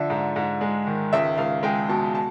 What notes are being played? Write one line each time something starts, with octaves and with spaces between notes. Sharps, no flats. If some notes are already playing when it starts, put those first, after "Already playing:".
Already playing: D3 F3 E5
G#2
G#2
G#3
D#3
C#2 E5
C#2 F5
G#3 G5
B2 A5
A5